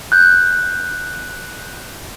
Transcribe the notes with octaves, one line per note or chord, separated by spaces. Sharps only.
F#6 G6